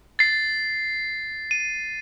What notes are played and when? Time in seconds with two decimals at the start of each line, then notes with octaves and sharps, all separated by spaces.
0.19 A6 C7
1.51 D#7